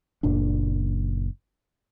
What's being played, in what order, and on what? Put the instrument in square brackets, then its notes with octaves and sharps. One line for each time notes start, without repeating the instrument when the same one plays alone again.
[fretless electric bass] F#1 A#2 D4